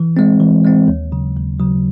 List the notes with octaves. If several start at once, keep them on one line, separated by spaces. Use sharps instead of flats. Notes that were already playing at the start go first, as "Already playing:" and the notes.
Already playing: E3
G#3 C4
E3
G#3 C4
D#2
C#3 F#3
D#2
C#3 F#3